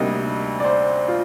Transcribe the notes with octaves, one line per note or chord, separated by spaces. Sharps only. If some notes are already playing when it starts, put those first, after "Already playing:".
Already playing: D2 C3 G3 A#3 D#4
D5
C5
F4